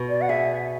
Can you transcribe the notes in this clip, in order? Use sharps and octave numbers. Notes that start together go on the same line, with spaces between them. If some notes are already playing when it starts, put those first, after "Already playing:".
Already playing: B2
D5
F#5
G#4 E5